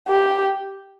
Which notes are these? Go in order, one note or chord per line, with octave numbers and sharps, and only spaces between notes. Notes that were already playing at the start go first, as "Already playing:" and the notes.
G4